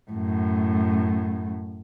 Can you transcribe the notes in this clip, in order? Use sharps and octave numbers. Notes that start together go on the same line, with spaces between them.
F#2 A2